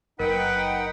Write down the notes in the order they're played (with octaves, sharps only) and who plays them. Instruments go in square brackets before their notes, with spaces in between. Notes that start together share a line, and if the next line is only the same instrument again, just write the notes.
[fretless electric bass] F#1 [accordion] D#4 F#5 G5 [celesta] A#4 [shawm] B4